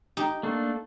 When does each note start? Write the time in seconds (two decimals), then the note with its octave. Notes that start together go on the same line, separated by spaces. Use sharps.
0.17 D#4 G4
0.43 A3 A#3 D4